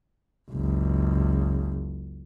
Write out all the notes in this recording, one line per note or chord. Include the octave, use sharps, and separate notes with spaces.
F#1 C#2